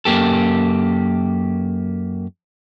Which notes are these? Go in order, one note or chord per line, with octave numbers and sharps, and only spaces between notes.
F#2 A#3 G4 A4